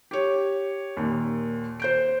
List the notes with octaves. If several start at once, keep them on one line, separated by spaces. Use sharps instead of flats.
G4 C#5
D#2 A#2
C5 G6 D7